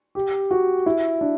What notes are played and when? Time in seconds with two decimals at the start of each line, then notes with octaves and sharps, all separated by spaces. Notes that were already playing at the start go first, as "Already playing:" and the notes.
0.15 G4
0.51 F#4
0.86 E4
1.21 D4